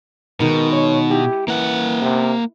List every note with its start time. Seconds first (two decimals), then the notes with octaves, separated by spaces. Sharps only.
0.40 B2 D#3 G#3 D#4 A#4
0.72 C#5
1.11 E4 G4
1.48 E3 A#3 F#5
2.02 C3